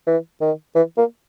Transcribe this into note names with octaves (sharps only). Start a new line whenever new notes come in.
E3
D#3
E3
A#3